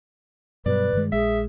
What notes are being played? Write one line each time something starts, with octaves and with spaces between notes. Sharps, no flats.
G2 B2 F#3 B4 D5
G2 D#3 G#3
A#1 G#3 G#4 E5